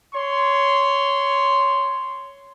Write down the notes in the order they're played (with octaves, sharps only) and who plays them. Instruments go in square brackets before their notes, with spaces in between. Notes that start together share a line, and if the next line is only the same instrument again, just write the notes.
[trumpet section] C#5 C6